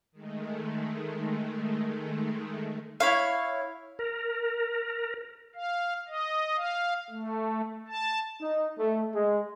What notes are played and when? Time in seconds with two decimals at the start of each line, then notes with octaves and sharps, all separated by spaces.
0.12 D#3 G#3 A3
3.00 E4 C#5 F5
3.99 A#4
5.55 F5
6.08 D#5
6.57 F5
7.10 A3
7.88 A5
8.41 D#4
8.79 A3
9.14 G#3